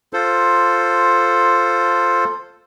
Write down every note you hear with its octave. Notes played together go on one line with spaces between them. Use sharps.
F4 A4 C5